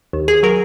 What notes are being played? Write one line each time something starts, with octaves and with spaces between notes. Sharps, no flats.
D#2
D#2 G#4
F#3 A#4